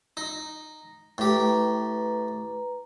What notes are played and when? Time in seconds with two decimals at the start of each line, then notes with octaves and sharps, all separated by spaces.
0.17 D#4
1.18 A2 G4 B4 A#5